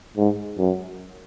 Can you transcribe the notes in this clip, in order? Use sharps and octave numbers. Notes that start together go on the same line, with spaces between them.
G#2
F#2